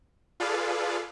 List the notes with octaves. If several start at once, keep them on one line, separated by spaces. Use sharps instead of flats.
F4 G#4 A4 B4 D5 F5